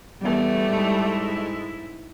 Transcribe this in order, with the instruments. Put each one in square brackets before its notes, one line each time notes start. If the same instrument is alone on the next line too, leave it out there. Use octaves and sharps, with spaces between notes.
[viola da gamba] E2 [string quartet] G3 A3
[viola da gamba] G#2 G#3 E4